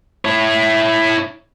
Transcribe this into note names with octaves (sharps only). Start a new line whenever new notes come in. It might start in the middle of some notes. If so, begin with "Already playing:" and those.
E4 C#5